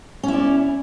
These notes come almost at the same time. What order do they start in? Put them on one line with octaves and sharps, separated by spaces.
C#4 E4 D5